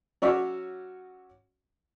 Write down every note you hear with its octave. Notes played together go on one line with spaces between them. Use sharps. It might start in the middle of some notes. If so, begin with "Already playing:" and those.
F#3 C#4 F#4 C#5 D5 E5